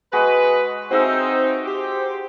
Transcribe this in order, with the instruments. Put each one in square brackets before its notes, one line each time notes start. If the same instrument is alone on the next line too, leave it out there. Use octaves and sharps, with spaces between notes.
[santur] G#3 F#4 D#5 [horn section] B4
[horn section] C4 D#4 [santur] F#4 G#4 E5 [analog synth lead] C5
[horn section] G4